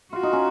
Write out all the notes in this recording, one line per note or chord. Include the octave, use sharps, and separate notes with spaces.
F4 F#4
D#4
C#4